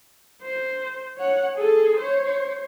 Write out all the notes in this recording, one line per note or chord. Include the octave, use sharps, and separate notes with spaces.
C5
C#5 F#5
G#4 A4
C5 C#5